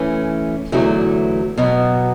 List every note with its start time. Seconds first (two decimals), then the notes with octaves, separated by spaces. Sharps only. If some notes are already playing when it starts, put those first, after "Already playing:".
Already playing: E3 A3 C#4
0.72 E2 D3 F#3 A3 E4
1.58 B2 F#3 B3